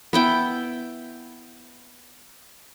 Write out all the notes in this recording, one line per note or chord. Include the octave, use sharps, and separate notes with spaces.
B3 E4 G5